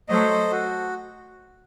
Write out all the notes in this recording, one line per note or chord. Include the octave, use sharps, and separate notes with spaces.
F#3 A3 A4 C5 D#5
F#4